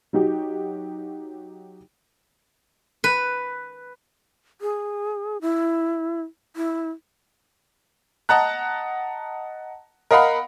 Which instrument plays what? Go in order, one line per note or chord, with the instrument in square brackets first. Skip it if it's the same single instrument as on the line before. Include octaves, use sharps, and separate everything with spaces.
[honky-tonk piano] F#3 D#4 F#4 G4
[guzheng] B4
[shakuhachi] G#4
E4
E4
[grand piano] D#5 F#5 A5 A#5 F#6
A#4 D#5 F5 F#5 B5